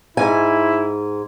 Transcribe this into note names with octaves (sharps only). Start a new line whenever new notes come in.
G#2 E4 G#5